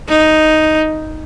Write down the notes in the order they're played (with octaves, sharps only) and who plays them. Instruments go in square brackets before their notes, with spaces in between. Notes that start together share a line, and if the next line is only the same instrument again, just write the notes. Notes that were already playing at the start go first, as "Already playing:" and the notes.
[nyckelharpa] D#4